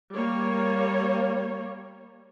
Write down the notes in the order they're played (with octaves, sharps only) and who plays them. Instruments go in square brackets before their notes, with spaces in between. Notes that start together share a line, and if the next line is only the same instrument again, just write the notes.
[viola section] G3 A#3 C#5